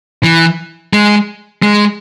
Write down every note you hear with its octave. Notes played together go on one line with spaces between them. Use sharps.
E3
G#3
G#3